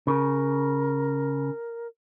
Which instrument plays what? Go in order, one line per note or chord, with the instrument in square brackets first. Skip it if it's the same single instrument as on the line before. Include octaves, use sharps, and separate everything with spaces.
[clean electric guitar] C#3 [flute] A#4